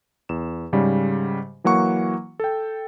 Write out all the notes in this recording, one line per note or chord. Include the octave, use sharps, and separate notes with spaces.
E2 E7
G#2 C#3 G3
E3 F#3 A#3 F#5 C#6
A4 G5